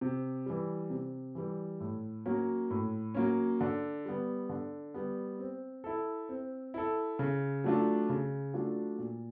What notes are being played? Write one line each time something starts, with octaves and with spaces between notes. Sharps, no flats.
C3
E3 G3
C3
E3 G3
A2
F#3 A#3 C#4
A2
F#3 A#3 C#4
D3
G3 B3
D3
G3 B3
C4
E4 A4
C4
E4 A4
C#3
F#3 A3 D4 F4
C#3
F#3 A3 D4 F4
A#2